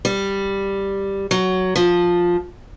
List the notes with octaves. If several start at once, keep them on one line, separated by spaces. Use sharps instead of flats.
G3
F#3
F3